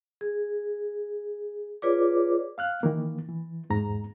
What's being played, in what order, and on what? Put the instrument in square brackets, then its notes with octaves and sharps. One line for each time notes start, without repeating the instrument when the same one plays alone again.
[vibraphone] G#4
F4 G#4 B4 C#5 D5 D6
[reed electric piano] F5 F6 F#6
D#3 E3 A#3
E3
E2 G#2 A#5